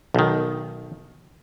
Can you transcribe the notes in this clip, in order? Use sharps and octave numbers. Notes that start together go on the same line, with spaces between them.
B1 D#3